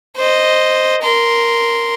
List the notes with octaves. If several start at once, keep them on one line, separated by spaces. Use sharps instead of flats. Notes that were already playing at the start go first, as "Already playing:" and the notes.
C5 D#5
A#4 C6